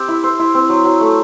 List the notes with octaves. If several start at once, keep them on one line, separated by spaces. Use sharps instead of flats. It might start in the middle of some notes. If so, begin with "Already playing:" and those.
Already playing: C4 G4 E5
E4
C5
E4
C4
F#3
F#3
A3